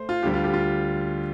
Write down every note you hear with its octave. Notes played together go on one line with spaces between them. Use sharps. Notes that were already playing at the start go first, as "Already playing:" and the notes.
Already playing: A3 C5
F4
D2 D3 G3 G4
F4
G4
F4